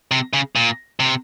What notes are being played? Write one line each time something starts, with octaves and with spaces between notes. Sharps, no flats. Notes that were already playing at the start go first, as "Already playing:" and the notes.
C3
C#3
A#2
C3